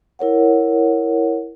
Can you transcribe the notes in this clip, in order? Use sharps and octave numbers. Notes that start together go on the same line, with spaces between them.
E4 A#4 C#5 F#5